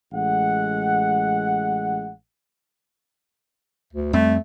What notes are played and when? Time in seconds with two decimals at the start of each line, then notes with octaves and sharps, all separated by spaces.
0.12 A1 G#3 F#5
3.93 D2
4.13 F2 G3 A3 C4